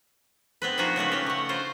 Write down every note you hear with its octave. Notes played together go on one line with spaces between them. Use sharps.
B3 C4 B4
F3 A#3 B3 D#4 F#4 G#4
C#3 A3 A#3 B4
C#4 G4
A3 F#5
F4 C5 A#5